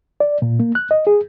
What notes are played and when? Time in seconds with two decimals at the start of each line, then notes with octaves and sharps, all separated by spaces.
0.20 D5
0.42 A#2
0.60 A#3
0.75 F#6
0.91 D#5
1.07 G#4